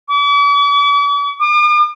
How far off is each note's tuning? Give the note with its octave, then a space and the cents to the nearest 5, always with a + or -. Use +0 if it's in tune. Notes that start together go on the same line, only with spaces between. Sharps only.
D6 -45
D6 +45